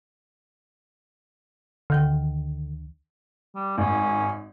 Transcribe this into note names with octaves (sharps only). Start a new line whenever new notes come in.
D2 D3 D#3 G5
G3
G#1 C#4